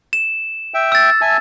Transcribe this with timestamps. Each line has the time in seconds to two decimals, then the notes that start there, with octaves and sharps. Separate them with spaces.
0.13 E7
0.74 E5 G5
0.92 E6 A6
1.21 E5 G#5 A5